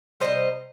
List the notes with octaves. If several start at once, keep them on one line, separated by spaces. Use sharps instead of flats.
C3 D#3 G3 C5 D#5